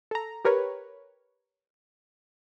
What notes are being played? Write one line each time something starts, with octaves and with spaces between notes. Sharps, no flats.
A4 A#5
G4 A#4 B4 C#5